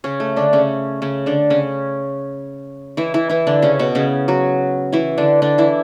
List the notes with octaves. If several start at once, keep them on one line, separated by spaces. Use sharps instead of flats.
C#3 C#4
A3
D3 D4
C#3 C#4
C#3 C#4
D3 D4
C#3 C#4
E3 E4
E3 E4
E3 E4
D3 D4
C#3 C#4
B2 B3
C#3 C#4
F#3 F#4
E3 E4
D3 D4
D3 D4
E3 E4